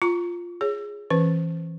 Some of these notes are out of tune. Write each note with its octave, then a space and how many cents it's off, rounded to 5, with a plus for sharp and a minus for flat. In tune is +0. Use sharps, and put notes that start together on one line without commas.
F4 +0 A#5 +0 C#6 +0
G#4 +0 C#5 +0
E3 +0 C#4 -25 B4 +0